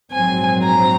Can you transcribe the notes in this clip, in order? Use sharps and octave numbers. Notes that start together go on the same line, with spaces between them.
A#1 G#2 F#3 C4 G#5
A#5